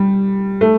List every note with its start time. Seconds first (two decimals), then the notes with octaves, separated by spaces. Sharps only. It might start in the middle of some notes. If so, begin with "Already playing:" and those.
Already playing: G3
0.61 A3